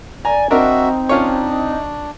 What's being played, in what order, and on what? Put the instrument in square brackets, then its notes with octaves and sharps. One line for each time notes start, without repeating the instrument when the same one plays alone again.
[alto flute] D5 [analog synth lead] G#5 [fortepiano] A#5
[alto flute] C4 [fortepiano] D4 A#4 [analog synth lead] D#4 [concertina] F#4 E5
[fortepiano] C#4 F4 C#5 [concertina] D4